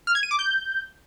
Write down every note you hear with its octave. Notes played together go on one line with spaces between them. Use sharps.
F6
G#6
D#7
D6
G6